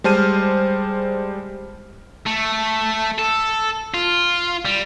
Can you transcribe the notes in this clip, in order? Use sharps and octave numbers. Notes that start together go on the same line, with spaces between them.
G3 G#3 C5 A5 F6 D#7
A3
A4
F4
G3